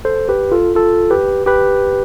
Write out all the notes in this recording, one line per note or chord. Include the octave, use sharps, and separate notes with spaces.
A4 C5
G4 B4
F4 A4
F4 A4
G4 B4
G4 B4